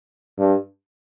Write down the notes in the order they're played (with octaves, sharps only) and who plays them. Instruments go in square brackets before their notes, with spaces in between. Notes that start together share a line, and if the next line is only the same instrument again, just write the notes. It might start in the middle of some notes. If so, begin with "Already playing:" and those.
[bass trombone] G2